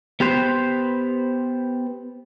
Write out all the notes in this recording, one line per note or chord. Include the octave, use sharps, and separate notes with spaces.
B3 G4 B4 C5